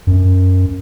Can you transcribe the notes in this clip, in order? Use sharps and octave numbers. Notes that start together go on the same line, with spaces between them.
F#2